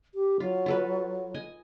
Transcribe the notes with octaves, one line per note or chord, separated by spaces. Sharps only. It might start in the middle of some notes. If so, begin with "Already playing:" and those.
G4
F#3 F4
F4 A4 B4
D#5 G#5